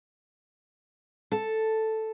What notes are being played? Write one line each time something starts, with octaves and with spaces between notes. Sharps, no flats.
A4